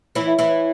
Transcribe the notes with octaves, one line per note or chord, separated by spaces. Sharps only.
E3 E4 C#5
E5
E3 E4 E5
C#5